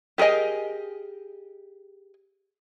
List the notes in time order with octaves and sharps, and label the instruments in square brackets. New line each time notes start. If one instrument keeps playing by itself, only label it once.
[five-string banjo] G4 G#4 A#4 D#5 G#5